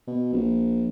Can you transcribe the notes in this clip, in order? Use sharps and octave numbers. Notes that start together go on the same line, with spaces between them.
B2
A#1